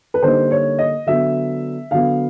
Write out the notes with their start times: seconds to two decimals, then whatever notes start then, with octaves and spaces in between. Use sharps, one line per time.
0.14 B4
0.22 D3 G3 A#3 D#4 C5
0.51 C#5
0.79 D#5
1.06 D3 F#3 B3 E5
1.91 D3 F#3 B3 F5